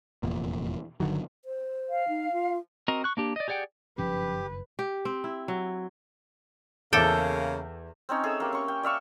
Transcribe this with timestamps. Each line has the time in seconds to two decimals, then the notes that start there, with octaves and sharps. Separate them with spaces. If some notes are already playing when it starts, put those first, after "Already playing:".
0.23 F1 E2 A#2
1.00 G1 D3 D#3 F#3
1.45 C5
1.90 F5
2.08 D#4
2.32 F4
2.88 C4 F#4 A#4 D#5 A#5
3.04 C#6 F#6
3.17 A#3 D4 G4
3.36 D5 D#5
3.48 G4 G#4 D5 F#5 G5
3.98 F#1 G2 D#3 F3 C#4 G4 B4
4.79 G4
5.05 C4
5.24 E4
5.48 F#3
6.93 E2 C#3 A#3 A4 E5 G5 D6
8.09 C4 C#4 D#4 C#5
8.24 G#4 A4 E5
8.40 A#3 G4
8.52 C#4 C#6
8.68 G5
8.83 D5 E5 F5 C#6